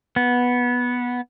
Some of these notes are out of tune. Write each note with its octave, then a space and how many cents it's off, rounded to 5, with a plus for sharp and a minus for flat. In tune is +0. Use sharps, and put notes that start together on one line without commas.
B3 -10